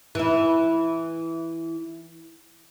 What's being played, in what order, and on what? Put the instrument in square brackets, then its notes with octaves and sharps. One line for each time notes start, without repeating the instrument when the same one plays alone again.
[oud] E3 E4